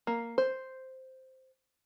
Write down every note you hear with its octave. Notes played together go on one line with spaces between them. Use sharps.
A#3
C5